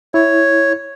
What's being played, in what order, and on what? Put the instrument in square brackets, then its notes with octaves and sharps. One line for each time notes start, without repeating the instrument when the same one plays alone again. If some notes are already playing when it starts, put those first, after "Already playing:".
[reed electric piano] E4 [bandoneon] C#5